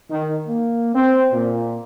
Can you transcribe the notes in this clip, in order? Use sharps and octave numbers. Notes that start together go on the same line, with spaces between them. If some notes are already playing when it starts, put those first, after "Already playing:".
D#3
A#3
C4
A#2